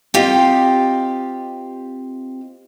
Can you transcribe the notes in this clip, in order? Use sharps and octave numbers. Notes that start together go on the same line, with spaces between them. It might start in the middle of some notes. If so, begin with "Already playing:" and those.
C4 F4 G4 D#5 F5 G5